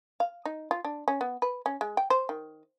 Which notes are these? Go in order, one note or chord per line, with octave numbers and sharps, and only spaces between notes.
F5
D#4
F4
D4
C#4
B3
B4
C#4
G#3
G5
C5
D#3